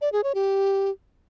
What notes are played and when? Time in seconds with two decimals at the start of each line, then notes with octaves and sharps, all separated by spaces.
0.01 D5
0.12 G#4
0.24 C#5
0.35 G4